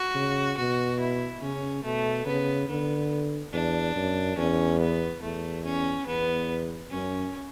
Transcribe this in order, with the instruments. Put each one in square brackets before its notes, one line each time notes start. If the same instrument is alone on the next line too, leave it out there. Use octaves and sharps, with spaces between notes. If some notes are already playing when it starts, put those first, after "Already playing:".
Already playing: [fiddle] F#4
[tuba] C#3
[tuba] B2 [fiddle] F#4
[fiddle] E4
[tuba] C#3 [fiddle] C#4
[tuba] B2 [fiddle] A3
[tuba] C#3 [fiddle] B3
[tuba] D3 [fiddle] B3
[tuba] E2 [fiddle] D4
[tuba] F#2
[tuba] E2 [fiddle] C#4
[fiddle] B3
[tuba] E2 [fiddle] A3
[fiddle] C#4
[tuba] E2 [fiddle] B3
[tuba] F#2 [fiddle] C#4